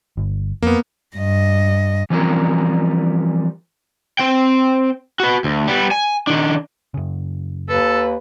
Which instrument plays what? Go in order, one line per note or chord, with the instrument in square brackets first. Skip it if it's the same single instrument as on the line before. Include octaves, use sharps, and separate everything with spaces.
[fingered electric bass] G1
[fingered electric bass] F2 [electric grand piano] A#3 B3
[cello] G2 D#5
[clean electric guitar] E3 F3 G3 C4 C#4 A#4
[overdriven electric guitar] C4 G5
F#4 B4
D2
G3 B3
G#5
D#3 D4
[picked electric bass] F#2 C#3
[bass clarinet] D#2 [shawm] A4 [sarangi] B4